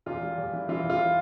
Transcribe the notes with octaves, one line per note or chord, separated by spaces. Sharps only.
E2 F4
G3
E2
E3
E3 F4
E2
F4
E3